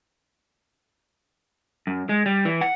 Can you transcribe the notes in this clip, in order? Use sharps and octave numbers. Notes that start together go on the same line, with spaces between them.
F#2
G#3
G3
E3
F#5